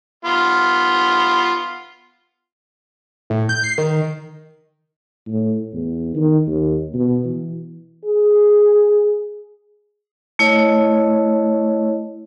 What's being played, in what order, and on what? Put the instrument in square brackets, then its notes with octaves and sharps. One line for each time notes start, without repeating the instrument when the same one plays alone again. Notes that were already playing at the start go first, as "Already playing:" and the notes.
[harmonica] B3 F4
[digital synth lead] A2
G6
C7
D#3
[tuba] A2
E2
D#3
D#2
B2
E3
[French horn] G#4
[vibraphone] A3 E4 C#5 D#5